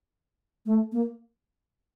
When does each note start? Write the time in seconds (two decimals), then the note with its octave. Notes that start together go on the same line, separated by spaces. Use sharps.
0.66 A3
0.92 A#3